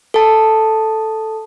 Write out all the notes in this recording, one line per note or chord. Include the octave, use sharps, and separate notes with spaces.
A4 A5